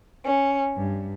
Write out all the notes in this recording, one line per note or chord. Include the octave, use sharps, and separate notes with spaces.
C#4
G2